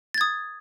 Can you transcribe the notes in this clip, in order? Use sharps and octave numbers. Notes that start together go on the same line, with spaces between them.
D#6 G#6 A6